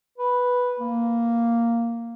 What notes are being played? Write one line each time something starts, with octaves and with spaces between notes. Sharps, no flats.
B4
A#3